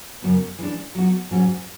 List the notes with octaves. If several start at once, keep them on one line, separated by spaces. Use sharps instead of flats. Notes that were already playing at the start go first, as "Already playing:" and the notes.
F#2 C#3 F#3 B3
E3 G#3 D4
F#3 B3 F#4
G#2 F#3 C#4 F#4